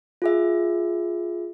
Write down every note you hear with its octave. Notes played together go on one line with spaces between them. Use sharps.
F4 G#4 E5